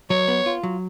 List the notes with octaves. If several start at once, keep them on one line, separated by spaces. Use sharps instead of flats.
F#3 C#5
B3
F4
F#3